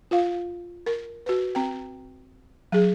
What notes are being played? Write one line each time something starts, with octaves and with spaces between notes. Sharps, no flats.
F4 F5
A#4
F#4 B4
C4 G5
F#3 G#4